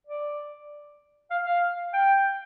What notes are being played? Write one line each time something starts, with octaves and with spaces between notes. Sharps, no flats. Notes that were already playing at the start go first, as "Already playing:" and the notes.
D5
F5
F5
G5